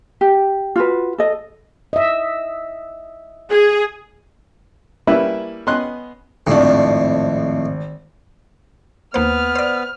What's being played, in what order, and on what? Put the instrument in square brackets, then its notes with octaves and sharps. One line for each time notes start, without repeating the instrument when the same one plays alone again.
[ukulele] G4
F4 F#4 B4
A4 D#5
[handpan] D#5 E5
[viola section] G#4
[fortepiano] G3 A#3 C#4 E4 B4 E5
B3 C#4 D#5 C6 F#6
[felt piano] G#1 D4 [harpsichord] F2 A2
[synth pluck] D#2 A#3 C5 [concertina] B3 B4 [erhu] F6
[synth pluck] C5 D5